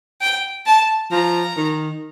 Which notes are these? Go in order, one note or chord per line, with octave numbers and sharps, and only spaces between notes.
G5
A5
F3 A#5
D#3